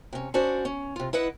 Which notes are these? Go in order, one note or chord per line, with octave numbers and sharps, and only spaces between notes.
C3 C#4
C#4 D4 F#4 C5 D5
C#4
C3 F4
E4 B4 D#5 F#5